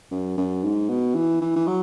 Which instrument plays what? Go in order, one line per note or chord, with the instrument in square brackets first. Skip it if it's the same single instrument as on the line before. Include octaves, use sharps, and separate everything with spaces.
[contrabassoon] F#2
F#2
G#2
B2
E3
E3
E3
F#3